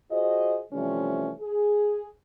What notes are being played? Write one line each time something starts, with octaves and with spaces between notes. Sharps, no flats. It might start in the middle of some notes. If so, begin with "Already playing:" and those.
F4 F#4 G#4 C5 D#5
C3 E3 F3 G3 A3 C#4
G#4